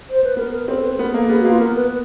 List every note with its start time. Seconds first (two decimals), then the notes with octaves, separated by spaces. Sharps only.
0.10 C5
0.24 B4
0.37 B3 A#4
0.52 A#4
0.68 C4 A4
0.84 B4
0.92 A4
0.99 B3 A#4
1.14 A#3 A4
1.29 B3 G#4
1.40 F#4
1.45 A#3
1.49 F4
1.60 B3 A#4
1.75 B4